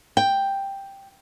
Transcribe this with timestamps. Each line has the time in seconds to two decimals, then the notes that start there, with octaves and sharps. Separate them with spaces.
0.17 G5